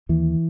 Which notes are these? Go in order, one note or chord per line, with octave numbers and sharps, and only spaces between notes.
D#2 E3